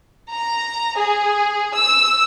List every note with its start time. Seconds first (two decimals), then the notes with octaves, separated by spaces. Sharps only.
0.30 A#5
0.96 G#4
1.75 E6